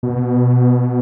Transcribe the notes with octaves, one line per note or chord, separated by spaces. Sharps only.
B2